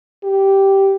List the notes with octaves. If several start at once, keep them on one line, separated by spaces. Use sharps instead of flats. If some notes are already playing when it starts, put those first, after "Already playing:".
G4